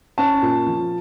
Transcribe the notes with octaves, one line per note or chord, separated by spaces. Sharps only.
C#4 A5
A#2
F3